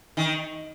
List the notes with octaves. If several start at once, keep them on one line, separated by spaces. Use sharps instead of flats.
D#3